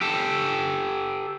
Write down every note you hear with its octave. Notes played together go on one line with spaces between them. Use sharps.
G4 A4